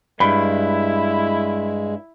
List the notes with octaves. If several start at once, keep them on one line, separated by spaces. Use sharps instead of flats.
G2 G#3 E4 B5